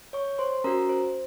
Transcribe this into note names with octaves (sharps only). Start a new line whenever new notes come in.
C#5 C#6
C5 C6
C#4 F#4 A#4 A#5
C5